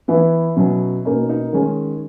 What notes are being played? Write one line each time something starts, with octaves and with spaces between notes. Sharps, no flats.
E3 B3 E4
B2 F#3 C#4
B2 A#3 C#4 D#4
D#4
D#3 G#3 C#4